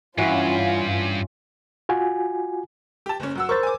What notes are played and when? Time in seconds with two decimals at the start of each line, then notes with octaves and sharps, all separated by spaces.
0.18 G2 E3 C#4 F4 F#4
1.89 F4 F#4 G#5
3.06 G4 A5
3.20 F#1 C#4
3.35 F#2 F#5 E6
3.49 A#4 C5 C#6 E6 A6
3.63 G#5 D6